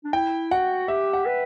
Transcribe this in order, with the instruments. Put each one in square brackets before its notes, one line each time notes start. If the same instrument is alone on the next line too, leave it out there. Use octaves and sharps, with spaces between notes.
[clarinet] D4
[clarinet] E4 [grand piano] G5
[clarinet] F#4 [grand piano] F#5
[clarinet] G4 [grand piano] E5
[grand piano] F#5
[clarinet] B4